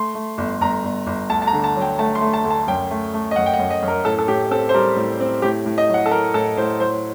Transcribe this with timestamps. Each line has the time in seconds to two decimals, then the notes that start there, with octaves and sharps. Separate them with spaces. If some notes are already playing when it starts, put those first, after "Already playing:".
Already playing: A3 C6
0.15 A3
0.38 G1
0.61 G1 A#5
0.84 G1
1.07 G1
1.30 D2 A5
1.42 A5
1.47 A#5
1.53 D3
1.64 A5
1.76 F#3
1.81 G5
1.99 A3 A5
2.15 C6
2.21 A3
2.34 A5
2.44 D2
2.50 A5
2.67 F#2 G5
2.91 A3
3.14 A3
3.31 D#5
3.36 F#2 F#5
3.46 G5
3.53 F#5
3.59 F#2
3.71 D#5
3.82 F#2
3.88 A#4
4.05 A2 A4
4.19 A4
4.28 A2 G4
4.51 C4 A4
4.69 C5
4.74 G3 A#4
4.96 A2
5.20 C4
5.42 A2 G4
5.66 A2
5.78 D#5
5.89 F#3 F#5
6.06 A4
6.11 F#3 A#4
6.34 A2 A4
6.57 A2 C5
6.80 F#3 C5